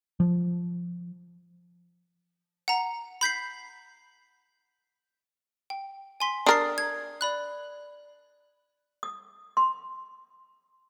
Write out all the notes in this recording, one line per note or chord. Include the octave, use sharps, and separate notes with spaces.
F3
F#5 A#5
B5 G6 B6 C7
G5
G#5 C6 B6
D4 A#4 D#6 A6 C7
G#6
D5 B5 F#6
D#6
C6